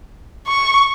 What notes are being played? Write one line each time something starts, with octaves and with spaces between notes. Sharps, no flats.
C#6